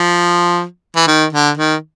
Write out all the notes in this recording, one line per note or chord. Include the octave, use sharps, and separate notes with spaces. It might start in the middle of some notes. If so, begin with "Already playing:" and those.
Already playing: F3
E3
D#3
D3
D#3